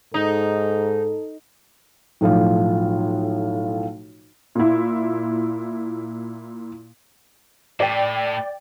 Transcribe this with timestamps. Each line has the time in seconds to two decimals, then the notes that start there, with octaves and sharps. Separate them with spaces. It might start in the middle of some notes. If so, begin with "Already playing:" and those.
0.14 G#2 D#4 A4
2.21 B1 A2 F3 F4
4.55 A#2 E4
7.80 A2 D5 G5